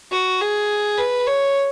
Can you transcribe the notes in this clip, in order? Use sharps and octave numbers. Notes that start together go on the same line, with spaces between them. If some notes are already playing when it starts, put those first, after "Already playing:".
F#4
G#4
B4
C#5